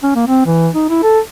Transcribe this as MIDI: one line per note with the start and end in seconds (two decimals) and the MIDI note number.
0.03 0.11 61
0.15 0.23 58
0.27 0.42 60
0.46 0.69 52
0.74 0.86 63
0.89 0.99 64
1.03 1.20 69